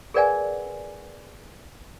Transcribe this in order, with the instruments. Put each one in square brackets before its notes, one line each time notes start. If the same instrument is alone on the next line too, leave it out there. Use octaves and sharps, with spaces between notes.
[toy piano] G#4 A#4 B4 D5 F#5 G#5